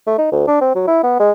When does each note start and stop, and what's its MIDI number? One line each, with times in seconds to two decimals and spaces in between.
0.07 0.16 57
0.18 0.29 63
0.32 0.44 38
0.47 0.57 62
0.61 0.73 60
0.75 0.83 54
0.88 1.00 64
1.03 1.17 59
1.19 1.31 56